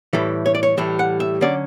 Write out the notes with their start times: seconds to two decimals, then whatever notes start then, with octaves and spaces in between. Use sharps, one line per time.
0.13 A2 E3 G3 A4
0.46 C#5
0.55 D5
0.63 C#5
0.77 A2 E3 G3 E5
0.99 F#5
1.20 E5
1.41 D3 F#3 C#4 D5